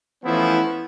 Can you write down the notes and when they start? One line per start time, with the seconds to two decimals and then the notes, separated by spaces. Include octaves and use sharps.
0.24 E3 F3 A3 B3 C#4 E4